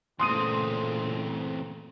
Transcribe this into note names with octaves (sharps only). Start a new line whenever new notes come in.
A#2 C#3 E3 A3 C4 C6 D#6 D#7